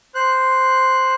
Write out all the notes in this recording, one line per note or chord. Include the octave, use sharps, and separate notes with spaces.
C5 F#6